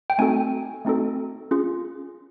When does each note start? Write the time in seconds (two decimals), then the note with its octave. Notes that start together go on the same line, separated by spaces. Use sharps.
0.10 G5
0.18 A3 C4 D#4 F#4 A4 G#5
0.85 A3 C4 D#4 F#4 A4
1.51 C#4 F4 G#4